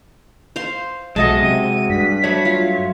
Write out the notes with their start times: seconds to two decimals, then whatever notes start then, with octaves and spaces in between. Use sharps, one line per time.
0.56 C5 F5 C6
1.16 B1 G#3 F#4 A4 D#5 E5 A5
1.42 C3 D#7
1.90 G2 B6
2.24 F#3 A3 C#5 B5
2.45 F4